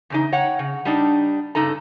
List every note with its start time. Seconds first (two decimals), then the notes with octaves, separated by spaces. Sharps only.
0.10 E2 C#3 D#4
0.33 C#5 F#5 G5
0.59 C#3
0.85 G3 D4 D#4
1.55 G2 C#3 D#4 A4 A#5